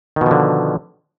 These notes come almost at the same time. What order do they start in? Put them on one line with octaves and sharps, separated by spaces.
D#3 B2 F3 D3